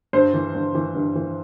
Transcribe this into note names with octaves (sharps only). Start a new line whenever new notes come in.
G2 C5
E3
G2
E3
G2
E3